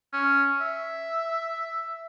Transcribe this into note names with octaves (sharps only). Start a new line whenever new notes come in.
C#4
E5